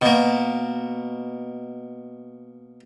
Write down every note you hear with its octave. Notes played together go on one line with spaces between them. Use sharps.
B2 A#3